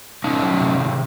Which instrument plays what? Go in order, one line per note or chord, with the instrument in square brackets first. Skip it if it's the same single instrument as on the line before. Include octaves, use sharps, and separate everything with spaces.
[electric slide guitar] C3 C#4 D#4
F#3
C3
D#3